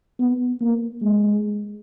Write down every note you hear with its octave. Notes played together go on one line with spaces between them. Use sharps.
B3
A#3
G#3